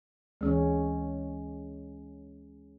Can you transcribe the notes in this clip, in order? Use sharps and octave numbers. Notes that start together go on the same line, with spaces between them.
D2 E3 G#3 C#4 C#5